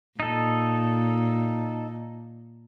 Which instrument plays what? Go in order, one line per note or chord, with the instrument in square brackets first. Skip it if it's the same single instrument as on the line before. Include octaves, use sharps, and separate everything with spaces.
[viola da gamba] A#2 [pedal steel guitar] D#4 A4